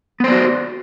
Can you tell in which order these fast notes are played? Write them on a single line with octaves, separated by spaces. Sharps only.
B3 C5 D5 F#4